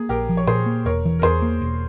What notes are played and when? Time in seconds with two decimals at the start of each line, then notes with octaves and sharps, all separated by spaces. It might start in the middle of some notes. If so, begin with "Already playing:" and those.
Already playing: A#3 G#4
0.09 A#1 G4 A#4
0.29 F3
0.37 C#5
0.47 A#2 G#4 C5
0.66 A#3
0.85 E1 A#4 C#5
1.05 E3
1.19 A#4
1.23 E2 G#4 C5
1.42 A#3
1.62 E1